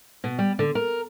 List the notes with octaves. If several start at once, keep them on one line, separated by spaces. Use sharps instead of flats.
B2
G3
D3
A#4